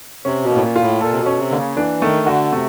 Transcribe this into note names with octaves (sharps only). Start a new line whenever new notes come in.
C3 C#4
B2
A2 A#3
A#2
F4
A2
A#2 A4
C3
B2
C#4
C3
D3 A#3
C#3
E3 D4
D#3 A3
D3 F#4
C3 A3